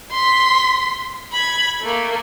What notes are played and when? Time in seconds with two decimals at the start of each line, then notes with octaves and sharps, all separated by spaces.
0.12 C6 B6
1.33 B5 G#6
1.81 A3 A#3